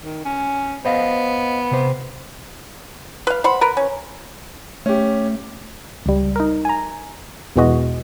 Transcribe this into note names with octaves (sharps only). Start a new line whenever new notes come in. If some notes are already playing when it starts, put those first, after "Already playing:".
D#3
C#4
B3 C5 D#5 F5
C3 C5
B4 F5
C5 F#5 B5
A#4 B4
C#4
A3 C#4 G4
C#2 G3
D#4 A#4
G#5 A#5
E2 B2 E3 G#3 F#4 D#5